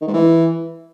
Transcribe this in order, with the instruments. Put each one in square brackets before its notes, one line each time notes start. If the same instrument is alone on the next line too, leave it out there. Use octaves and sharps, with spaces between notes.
[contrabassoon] D#3
G#2
E3